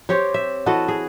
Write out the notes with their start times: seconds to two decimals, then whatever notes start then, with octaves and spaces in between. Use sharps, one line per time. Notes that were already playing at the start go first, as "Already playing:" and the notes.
0.09 C4 G4 C#5
0.34 E5
0.66 E3 F#4 A4 D#5
0.88 G#4